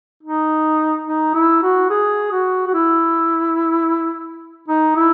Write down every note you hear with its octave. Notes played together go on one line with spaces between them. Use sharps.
D#4
D#4
E4
F#4
G#4
F#4
F#4
E4
D#4
E4